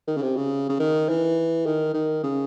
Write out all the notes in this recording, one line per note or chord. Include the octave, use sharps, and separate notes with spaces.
D#3
C#3
C3
C#3
C#3
D#3
E3
D#3
D#3
C#3